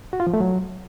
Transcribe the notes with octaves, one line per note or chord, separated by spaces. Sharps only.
F#4
F4
F3
A3
F#3